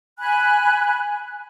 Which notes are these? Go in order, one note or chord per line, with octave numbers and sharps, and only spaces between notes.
G#5 B5 F#6